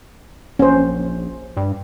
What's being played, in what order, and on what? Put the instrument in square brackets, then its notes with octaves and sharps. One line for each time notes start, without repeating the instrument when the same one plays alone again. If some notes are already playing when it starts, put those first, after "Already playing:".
[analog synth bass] A#1 [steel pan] C#4 C5
[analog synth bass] G2